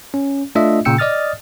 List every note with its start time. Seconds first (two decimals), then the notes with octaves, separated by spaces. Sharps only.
0.14 C#4
0.55 A3 D4 F4 D#5 E5
0.85 A#2 C#3 G5 E6 C#7
0.98 D5 D#5 D#6 F6 A6